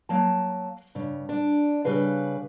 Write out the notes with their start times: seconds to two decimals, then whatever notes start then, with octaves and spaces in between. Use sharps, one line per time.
0.09 F#3 A#3 A5
0.95 G2 C#3
1.29 D4
1.84 C#3 G3 B4 F5